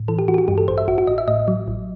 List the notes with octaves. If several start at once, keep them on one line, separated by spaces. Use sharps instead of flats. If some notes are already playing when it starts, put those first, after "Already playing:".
Already playing: A2
E3 A4
G4
E3 F#4
G4
F#4
G2 G4
A4
A1 C5
E5
A1 F#4
F#4
A1 D#5
E5
A2 D#5
F#3
A1